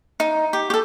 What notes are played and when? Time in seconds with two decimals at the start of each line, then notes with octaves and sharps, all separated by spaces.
0.20 D#4
0.53 G4
0.70 G4 A4